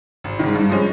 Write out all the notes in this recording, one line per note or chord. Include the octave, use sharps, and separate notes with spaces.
G#1
G#2 D#3
G2
F3 G#3 C#4